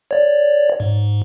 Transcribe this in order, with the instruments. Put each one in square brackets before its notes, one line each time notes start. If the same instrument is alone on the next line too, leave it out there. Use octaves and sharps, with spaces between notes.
[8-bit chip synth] C#5 D5
G#2